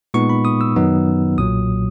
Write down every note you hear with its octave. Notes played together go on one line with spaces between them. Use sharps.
A#2 G#3 B3 D#4 C#6
B5
D#6
E6
F#2 D#3 F#3 B3 D#4
B1 A#2 F#3 D#6